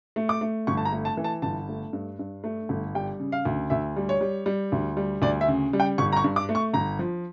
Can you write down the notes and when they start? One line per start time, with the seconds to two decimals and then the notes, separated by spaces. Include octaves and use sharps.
0.16 A3
0.29 D6
0.41 A3
0.67 G1 C#6
0.77 A5
0.85 A#5
0.92 A3
1.05 A5
1.17 E3
1.24 A5
1.42 G1 A5
1.69 A3
1.93 G2
2.19 G2
2.44 A3
2.69 G1
2.95 G3 G5
3.20 C#3
3.32 F5
3.45 D2
3.70 D2 E5
3.96 G3
4.09 C#5
4.21 G3
4.46 G3
4.72 D2
4.97 G3
5.22 D2 D5
5.41 E5
5.48 C#3
5.73 G3
5.80 G5
5.98 G1 C#6
6.12 A#5
6.17 C#6
6.24 G2
6.36 D6
6.49 A3
6.55 C#6
6.73 G1 A#5
6.99 F3